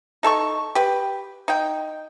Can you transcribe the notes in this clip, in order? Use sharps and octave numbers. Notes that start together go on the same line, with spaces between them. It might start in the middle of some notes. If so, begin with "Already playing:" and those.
D#4 A4 A5 C#6
G4 B4
D#4 G5